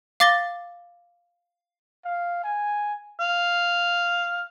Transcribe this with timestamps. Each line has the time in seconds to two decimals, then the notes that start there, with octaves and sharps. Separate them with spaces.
0.20 F5 D6 A6 A#6 G7
2.05 F5
2.43 G#5
3.20 F5